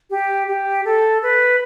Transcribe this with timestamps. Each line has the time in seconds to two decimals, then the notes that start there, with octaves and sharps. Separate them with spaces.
0.10 G4
0.47 G4
0.85 A4
1.23 B4